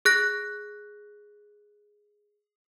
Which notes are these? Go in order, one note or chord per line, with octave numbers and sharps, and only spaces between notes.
G#4 F#6 A#6